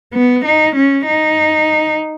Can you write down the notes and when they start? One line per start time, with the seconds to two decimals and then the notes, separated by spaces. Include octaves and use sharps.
0.13 B3
0.44 D#4
0.75 C#4
1.07 D#4